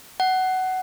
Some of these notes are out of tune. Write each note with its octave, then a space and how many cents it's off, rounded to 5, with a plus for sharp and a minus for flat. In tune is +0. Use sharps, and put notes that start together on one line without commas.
F#5 +15